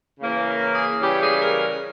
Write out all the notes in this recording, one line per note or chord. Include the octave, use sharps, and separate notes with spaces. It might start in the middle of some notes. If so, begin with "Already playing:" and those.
C#3 E3 A#3 C#4
A#4
G#4
C#3 E3 G3 C#4 G4
G#4
A#4